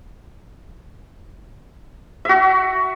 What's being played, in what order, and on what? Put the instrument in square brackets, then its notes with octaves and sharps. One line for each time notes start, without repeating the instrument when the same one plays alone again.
[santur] F#4 E5